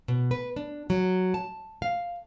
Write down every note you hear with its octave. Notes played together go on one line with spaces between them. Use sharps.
B2
B4
D4
F#3
A5
F5